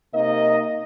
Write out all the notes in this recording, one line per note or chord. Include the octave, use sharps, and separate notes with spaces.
C3 A#3 D#4 D#5